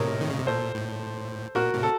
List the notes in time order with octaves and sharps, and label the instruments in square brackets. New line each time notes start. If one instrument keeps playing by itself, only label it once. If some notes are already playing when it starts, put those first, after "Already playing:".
Already playing: [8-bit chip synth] A2 C3 [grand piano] A#4 C#5 D#5
[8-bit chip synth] D#3
C#3
C3
[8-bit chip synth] A#2 [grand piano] A4 C5
[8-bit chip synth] A2
[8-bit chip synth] A#2 [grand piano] F#4 A#4
[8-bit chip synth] A2 C3
[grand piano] A4